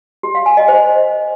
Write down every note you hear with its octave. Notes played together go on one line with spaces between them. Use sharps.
G4
F5
G#5
D#5
C5